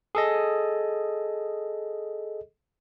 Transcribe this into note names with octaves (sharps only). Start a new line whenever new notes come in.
G#4 A4 D#5